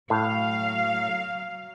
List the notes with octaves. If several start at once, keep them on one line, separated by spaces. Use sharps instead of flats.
A2 F#3 F5